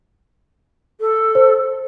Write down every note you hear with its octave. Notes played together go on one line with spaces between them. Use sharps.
A4
C5